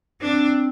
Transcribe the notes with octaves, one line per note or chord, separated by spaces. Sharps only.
C4 D4